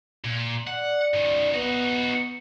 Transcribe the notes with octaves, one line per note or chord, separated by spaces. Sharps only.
A#2
D5 F#5
F#2 D#3
B3 D#4 F#4